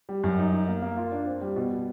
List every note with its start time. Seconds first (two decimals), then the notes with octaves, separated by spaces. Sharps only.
0.09 G3
0.24 F#2
0.39 D#4
0.53 D#4
0.68 A#3
0.82 A#3
0.97 F4
1.12 D4
1.26 C4
1.41 G3
1.56 B2